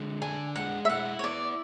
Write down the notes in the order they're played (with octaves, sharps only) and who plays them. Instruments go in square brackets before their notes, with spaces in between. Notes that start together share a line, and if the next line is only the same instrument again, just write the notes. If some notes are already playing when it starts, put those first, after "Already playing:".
Already playing: [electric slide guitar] D3 G#3
[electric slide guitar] D4 [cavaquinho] G#5
[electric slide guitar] G#3 [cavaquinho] F#5
[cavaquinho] E5
[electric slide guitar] E4 [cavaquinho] F#5
[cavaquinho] C#5
[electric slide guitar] B3 [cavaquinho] D5